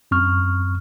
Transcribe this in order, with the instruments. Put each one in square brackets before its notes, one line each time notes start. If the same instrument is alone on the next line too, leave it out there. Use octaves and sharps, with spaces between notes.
[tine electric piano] F#2 C4 C#6 F6